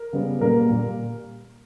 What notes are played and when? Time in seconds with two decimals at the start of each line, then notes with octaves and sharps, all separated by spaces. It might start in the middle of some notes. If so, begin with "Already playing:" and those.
Already playing: A#4
0.13 C#3 G3 B3
0.40 A#2 G3 A#3 A#4
0.69 A#2 G3 A#3